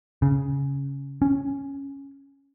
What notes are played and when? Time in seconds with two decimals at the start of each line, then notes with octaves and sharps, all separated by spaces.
0.22 C#3
1.22 C#4